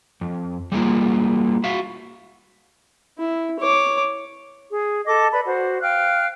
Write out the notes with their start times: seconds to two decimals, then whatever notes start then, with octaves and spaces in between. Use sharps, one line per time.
0.21 F2
0.72 G3 G#3 A#3 F4
1.64 F#4 E5 F5
3.19 E4
3.59 C#5 D6
4.71 G#4
5.06 A4 D#5 D6
5.33 B4 D5 B5
5.45 F#4 C5
5.81 F5 G5 F6 F#6